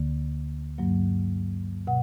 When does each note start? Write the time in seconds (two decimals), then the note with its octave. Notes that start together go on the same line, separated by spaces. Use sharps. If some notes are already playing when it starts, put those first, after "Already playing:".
Already playing: D2 D3 A#3
0.78 G2 F#3 A#3
1.87 B2 F#5